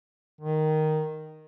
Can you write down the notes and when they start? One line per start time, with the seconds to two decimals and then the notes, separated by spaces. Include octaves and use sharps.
0.41 D#3